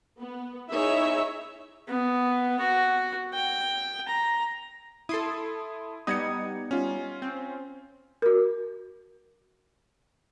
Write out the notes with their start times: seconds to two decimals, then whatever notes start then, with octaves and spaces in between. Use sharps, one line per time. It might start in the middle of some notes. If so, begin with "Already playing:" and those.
0.18 B3
0.71 D#4 E4 G#4 C#5 E5
1.88 B3
2.60 F#4
3.34 G5
4.07 A#5
5.09 E4 A4 C6 D#6
6.07 G3 B3 D#4 D#6 G#6 C#7
6.71 C#4 F4
7.22 C4
8.22 F#4 A#4